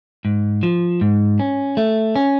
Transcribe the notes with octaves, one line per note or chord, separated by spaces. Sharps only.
G#2
F3
G#2
C#4
A3
C#4